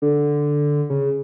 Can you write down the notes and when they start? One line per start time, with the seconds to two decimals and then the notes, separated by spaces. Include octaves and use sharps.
0.02 D3
0.90 C#3